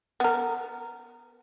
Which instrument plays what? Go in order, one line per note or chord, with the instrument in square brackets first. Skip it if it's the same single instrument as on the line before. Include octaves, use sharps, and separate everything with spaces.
[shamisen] B3 A#4